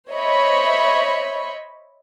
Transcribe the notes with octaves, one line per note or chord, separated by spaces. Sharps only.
C5 C#5 D#5 E5 B5 C#6